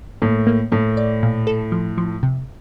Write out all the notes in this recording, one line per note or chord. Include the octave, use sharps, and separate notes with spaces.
A2 A#3
A#3
A2 A#3
D5
A#2
A4
F3
F3
C3